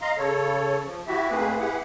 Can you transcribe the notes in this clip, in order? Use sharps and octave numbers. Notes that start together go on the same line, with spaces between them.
D#5 F5 A#5 C6
C#3 A4 C#5
F3
E4 F#4 G4 E5
G#2 A3 A#3 C4 G#4 B4
E4 G4 G#4 B4 F#5